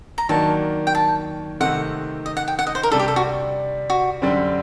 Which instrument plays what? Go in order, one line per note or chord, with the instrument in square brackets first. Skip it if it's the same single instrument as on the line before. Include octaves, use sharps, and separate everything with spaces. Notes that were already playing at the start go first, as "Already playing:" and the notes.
[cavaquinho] A#5
[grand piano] D#3 F#3 A#3 D4 [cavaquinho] A5
[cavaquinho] G5
A5
[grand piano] C3 D#3 A3 C4 D#4 [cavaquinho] F#5
[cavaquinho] D#5
F#5
G5
F#5
D#5
C5
A#4
[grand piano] C3 G3 D4 [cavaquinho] A4
[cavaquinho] G4
A4
F#4
F#4
[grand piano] F#2 D3 G3 C4